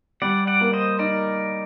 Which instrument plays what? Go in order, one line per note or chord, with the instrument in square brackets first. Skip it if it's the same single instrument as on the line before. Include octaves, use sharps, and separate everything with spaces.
[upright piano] G3 [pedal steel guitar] D5 F#5
[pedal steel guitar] D5 F#5
[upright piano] A#3
[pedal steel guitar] C5 D#5
[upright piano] D#4 [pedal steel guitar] A#4 D5